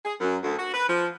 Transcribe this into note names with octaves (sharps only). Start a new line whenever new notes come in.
G#4
F#2
D2
F#4
B4
F3